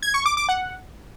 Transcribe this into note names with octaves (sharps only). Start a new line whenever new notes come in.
G#6
C#6
D6
D6
F#5